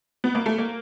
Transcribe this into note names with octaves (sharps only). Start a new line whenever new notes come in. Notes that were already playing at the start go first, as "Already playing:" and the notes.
B3
A#3
A3
A#3